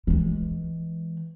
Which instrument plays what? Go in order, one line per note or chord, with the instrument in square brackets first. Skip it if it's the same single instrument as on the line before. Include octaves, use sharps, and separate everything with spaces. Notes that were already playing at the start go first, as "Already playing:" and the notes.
[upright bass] E3 G#3